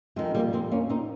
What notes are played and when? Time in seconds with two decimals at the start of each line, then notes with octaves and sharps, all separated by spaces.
0.16 F2 D#3 G#3
0.35 G3 A#3
0.53 G#3 C4
0.72 A#3 C#4
0.89 C4 D#4